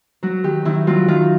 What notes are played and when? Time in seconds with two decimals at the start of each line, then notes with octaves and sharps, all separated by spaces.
0.23 F#3 F#4
0.44 D#3 G4
0.65 D#3 E4
0.87 F#3 F4
1.08 D#3 F4